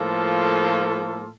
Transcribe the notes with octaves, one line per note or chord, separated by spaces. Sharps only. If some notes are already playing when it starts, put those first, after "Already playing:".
Already playing: A2 F3 A#3 F4 A4